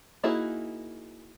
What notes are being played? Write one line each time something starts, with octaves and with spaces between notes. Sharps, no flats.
A#3 D#4 E4 F#4 G#4